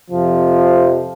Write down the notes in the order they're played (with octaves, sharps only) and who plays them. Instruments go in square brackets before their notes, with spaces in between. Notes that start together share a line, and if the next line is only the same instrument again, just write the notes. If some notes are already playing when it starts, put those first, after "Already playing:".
[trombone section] F2 C3 F3